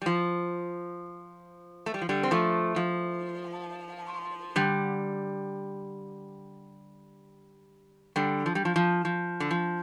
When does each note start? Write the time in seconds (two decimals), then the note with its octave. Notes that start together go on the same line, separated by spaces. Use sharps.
0.02 G3
0.06 F3
1.86 A3
1.94 G3
2.01 F3
2.09 D3 G3
2.23 C4
2.31 F3 A3
2.76 F3
4.56 D3 G3
8.16 D3 G3
8.46 F3
8.55 G3
8.65 F3
8.76 F3
9.05 F3
9.40 D3
9.51 F3